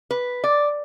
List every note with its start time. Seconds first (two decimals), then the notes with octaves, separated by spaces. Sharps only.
0.11 B4
0.44 D5